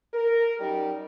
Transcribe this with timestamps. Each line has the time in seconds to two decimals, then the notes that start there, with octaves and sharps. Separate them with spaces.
0.14 A#4
0.60 F#2 G3 D#4 G4